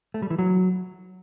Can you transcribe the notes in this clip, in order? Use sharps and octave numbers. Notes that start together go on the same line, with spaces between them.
A3
G3
E3
F#3